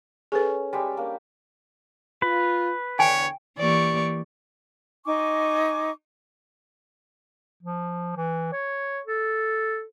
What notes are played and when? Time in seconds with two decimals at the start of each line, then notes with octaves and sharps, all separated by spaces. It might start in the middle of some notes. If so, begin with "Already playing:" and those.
0.32 C#4 G#4 A4 B4
0.73 G3 G#3 G4
0.97 A#3 D4
2.22 F4 B4
2.99 E2 D3 C#5 G5 G#5
3.58 E3 A#3 G4 D5 C#6
5.06 D#4 G#5 C#6 D6
7.63 F3
8.16 E3
8.53 C#5
9.06 A4